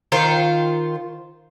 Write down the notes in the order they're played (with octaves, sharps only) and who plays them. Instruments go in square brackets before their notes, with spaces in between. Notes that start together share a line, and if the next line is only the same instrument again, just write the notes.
[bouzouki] D#3 F4 C5